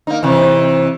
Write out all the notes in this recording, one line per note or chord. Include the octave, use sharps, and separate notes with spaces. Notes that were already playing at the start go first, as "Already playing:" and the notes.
A#3 D#4
C3 E3